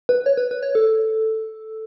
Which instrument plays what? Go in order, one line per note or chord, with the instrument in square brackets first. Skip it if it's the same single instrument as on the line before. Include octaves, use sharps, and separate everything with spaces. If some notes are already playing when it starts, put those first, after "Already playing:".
[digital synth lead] B4
C#5
B4
B4
C#5
A4